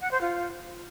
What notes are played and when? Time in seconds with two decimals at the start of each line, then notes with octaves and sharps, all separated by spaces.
0.01 F#5
0.11 C5
0.21 F4